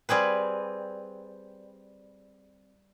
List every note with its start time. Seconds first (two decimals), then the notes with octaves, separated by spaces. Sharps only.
0.09 G3 C4 G#4 B4